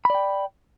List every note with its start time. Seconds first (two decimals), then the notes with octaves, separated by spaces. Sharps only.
0.05 B5
0.10 D5
0.15 G5